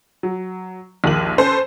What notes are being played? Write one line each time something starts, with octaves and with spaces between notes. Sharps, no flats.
F#3
A#1 D#2 A#3 D#7 F#7
C#4 A4 B4 C5